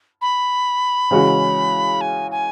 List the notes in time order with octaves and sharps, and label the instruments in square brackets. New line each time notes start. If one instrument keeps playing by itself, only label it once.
[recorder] B5
[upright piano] C#3 E3 G#3 C#4 F#4
[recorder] G#5
G#5